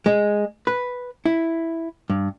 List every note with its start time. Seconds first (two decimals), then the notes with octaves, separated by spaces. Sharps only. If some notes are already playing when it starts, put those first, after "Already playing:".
0.06 G#3
0.67 B4
1.26 E4
2.10 G2